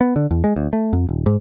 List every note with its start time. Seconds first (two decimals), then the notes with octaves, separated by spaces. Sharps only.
0.01 B3
0.16 D3
0.31 E2
0.44 G#3
0.56 D2
0.73 A3
0.93 F2
1.09 D#1
1.26 G#2